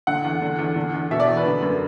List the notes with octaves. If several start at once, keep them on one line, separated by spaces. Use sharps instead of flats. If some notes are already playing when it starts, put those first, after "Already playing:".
D3 F#5
E2
D3
E2
D3
E2
B2 E5
D5
E2
B4
D3
F#2